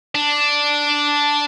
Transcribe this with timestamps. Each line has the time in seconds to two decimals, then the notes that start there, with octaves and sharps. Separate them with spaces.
0.15 D4